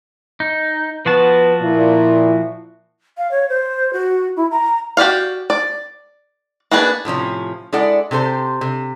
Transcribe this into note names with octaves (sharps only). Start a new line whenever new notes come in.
D#4
F3 B3 F#4 A5
A#2 E4
F5
C#5
C5
F#4
E4
A#5
F#4 G4 D5 F5
D5
A#3 B3 D4 G#4 B4
A2 C3 F3 C#4
G#3 E4 A4 D5 F#5
C3 G4 A4 C5
C3